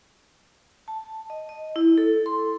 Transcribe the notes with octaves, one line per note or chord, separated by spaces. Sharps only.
A5
D#5
D#5
E4
A4
C6